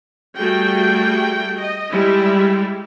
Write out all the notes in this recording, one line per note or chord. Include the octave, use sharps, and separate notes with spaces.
G3 A3 F#4 G#4 G5
D#5
G3 G#3 E4